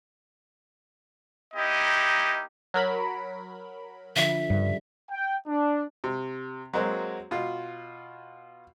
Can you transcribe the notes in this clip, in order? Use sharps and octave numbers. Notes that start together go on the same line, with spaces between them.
A#3 D#4 E4 G4 D#5
F#3 A#4 B5
D3 F3 E5
G2 C#3 G3
G5
D4
C3
F#3 G#3 A#3 C4 F#4
B2 F4